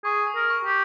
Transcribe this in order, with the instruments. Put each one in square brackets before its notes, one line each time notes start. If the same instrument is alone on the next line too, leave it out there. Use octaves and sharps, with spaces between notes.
[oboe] G#4 [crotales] C#6
[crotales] D#6
[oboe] A#4
[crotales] C#6
[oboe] G4